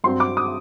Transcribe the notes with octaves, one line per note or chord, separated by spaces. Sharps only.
G2 F#3 C4 C6
D6
D#6